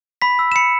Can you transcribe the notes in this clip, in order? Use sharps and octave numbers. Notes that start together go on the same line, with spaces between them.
B5 B6
E6
E7
B5 C#7